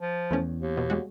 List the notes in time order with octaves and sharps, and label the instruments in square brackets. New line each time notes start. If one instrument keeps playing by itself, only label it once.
[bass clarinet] F3
[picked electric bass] E2 [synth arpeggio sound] E3 A3 C#4
[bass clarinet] D#2
[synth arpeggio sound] B2
G3 G#3 F#4